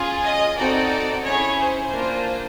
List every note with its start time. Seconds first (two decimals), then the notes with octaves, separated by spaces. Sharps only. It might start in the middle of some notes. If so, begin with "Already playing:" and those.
Already playing: C#4 F4 G#4
0.23 D#5
0.57 C4 D#4 F#4 A4 D5
1.24 C#4 E4 G#4 C#5
1.59 C5
1.92 A#3 D4 F4